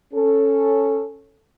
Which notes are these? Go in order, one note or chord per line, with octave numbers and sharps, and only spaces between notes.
C#4 A4